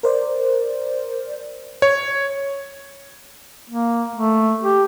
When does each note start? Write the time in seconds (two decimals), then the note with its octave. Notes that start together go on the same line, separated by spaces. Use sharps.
0.03 A#4 C5 D5
1.82 C#5
3.70 A#3
4.16 A3
4.62 G4